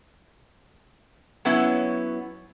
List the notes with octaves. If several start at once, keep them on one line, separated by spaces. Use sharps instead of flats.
F#3 B3 C#4 E4